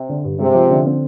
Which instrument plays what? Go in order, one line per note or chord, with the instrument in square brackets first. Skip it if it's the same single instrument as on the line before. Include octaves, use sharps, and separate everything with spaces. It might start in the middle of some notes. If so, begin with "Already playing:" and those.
Already playing: [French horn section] C3
[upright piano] D3
G2
[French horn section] C3 [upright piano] G#3
[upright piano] F3
D3
C4